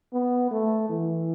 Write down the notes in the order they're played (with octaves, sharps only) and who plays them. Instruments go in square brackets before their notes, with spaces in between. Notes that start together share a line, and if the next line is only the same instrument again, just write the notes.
[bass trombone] B3
A3
E3